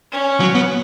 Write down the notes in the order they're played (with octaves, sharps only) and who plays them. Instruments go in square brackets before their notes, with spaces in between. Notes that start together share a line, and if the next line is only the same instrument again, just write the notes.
[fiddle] C#4
[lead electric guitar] F#3
B3